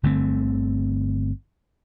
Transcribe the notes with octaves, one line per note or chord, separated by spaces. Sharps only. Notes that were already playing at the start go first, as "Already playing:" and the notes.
G1 D3 A3 C4